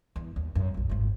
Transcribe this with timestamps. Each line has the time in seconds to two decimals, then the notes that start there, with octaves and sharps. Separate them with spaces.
0.16 E2
0.36 D#2
0.55 F#2
0.74 A#1 F#2
0.89 G#1 F2